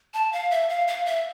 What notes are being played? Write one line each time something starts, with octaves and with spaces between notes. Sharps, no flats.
A5
F5
E5
F5
F5
E5